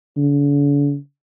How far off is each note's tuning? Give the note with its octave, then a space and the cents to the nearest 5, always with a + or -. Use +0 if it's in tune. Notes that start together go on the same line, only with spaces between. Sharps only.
D3 -45